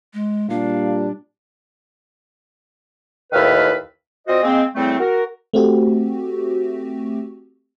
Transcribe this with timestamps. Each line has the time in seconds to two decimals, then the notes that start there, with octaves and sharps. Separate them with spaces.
0.14 G#3
0.50 A#2 G3 D4 F5
3.33 D#2 A2 D#3 B4 E5 F5
4.27 C4 F4 F#4 C5 D5 D#5
4.43 G#3 A#3 C4
4.75 E2 A2 G3 A3 C4
4.99 F#4 A#4
5.53 A3 C4 F#4 G4